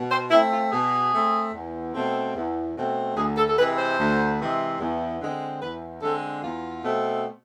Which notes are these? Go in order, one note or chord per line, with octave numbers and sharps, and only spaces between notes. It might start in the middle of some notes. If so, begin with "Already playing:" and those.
Already playing: B2
C5
A3 C4 E4
F4
B2 G#4
A3 C4
E2
B2 A3 C4
E2
B2 A3 C4
D2 G#4
A4
A4
C3 E3 G#3 B4
C5
D2
C3 E3 G#3
E2
D3 G#3 C4
E2 B4
D3 G#3 C4 A4
E2 F4
B2 A3 C4